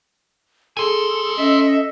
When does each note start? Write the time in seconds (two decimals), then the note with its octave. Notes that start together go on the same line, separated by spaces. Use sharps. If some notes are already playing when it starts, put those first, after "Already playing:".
0.77 G#4 A4 G#5 C6
1.38 C#4 A4 D#5 E5